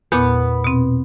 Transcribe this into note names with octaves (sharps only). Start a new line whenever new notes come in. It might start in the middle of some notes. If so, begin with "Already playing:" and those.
E2 A#2 B3
B2 C4